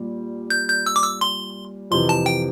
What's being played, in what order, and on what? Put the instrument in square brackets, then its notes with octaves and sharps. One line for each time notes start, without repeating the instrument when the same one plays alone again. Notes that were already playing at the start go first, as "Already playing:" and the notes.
Already playing: [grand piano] A#2 G3
[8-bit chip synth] G6
G6
E6
D6
E6
C6
[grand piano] F2 C3 E3 [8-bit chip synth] C6
[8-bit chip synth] A5
G5